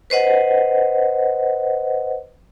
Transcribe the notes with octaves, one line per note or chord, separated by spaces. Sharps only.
B4 C5 D#5 F#5